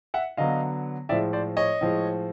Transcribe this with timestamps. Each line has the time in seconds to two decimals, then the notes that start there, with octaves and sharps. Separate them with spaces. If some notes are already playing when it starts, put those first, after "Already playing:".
0.14 E5 F#5
0.37 D3 F#3 B3 D#5 F5
1.09 A2 F3 G#3 D5 E5
1.33 C5 D5
1.57 C#5 D#5
1.81 A2 F3 G#3